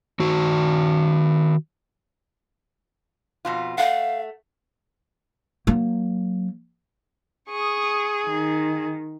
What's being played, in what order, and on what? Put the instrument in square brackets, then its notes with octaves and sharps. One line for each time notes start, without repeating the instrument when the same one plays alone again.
[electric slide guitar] D#3 F#4
[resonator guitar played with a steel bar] F2 B2 F4
[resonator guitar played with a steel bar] A3 F#5 [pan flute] F5
[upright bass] F#3 A#3
[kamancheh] G#4 [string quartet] C#6 D#6
[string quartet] D#3